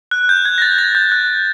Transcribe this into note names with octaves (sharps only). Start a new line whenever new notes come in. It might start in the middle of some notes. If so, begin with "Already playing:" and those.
F#6
G6
G#6
A#6
A6
A6
G6
F#6